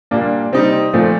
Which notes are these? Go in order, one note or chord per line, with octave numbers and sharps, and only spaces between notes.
A#2 G3 A#3 D4
C3 G3 C4 D#4
A#2 F3 A3 C4